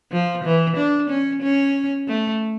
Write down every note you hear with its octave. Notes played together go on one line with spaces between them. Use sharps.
F3
E3
D4
C#4
C#4
A3